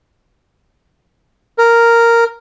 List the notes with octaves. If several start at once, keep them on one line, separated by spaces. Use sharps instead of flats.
A#4